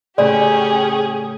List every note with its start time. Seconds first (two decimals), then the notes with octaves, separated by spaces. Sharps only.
0.18 A2 C#3 C#4 G4 G#4 D5